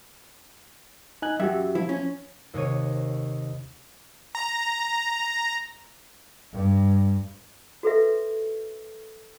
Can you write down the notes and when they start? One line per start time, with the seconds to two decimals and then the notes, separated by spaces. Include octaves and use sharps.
1.22 D#4 G#5 F#6
1.40 F#2 F#4 G4 E5
1.75 F3 E4
1.89 C#4
2.54 D#2 C3 C#5 D#7
4.35 A#5
6.52 G2
7.83 F#4 A4 B4 E5